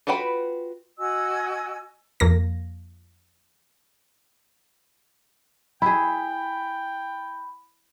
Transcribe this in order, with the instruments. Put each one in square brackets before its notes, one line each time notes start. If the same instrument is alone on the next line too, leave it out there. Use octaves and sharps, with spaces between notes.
[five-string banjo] F4 F#4 B4 G5 B5
[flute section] F#4 D#5 G#5 E6
[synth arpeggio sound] F2 A#3 A#6
[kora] E4 G#4 [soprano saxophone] G5 [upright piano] B5